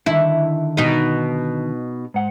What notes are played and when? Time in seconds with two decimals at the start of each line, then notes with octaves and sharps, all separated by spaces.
0.06 D3 D#3 E4
0.77 B2 D#4
2.14 G#2 F#5